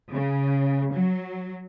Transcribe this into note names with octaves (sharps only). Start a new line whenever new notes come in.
C#3
F#3